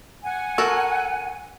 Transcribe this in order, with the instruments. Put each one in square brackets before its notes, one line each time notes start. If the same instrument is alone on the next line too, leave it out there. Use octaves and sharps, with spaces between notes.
[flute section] F#5 G#5
[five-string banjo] F#4 A4 A#4